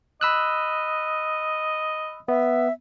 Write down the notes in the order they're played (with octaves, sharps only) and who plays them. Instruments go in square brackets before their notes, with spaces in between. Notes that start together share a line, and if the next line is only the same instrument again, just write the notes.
[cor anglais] D#5 [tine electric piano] B5 E6 F#6
[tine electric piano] B3 [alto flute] E5